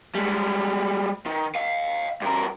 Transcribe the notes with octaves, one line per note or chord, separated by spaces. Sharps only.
G3 G#3
D#3
D#5 F5
G2 A#4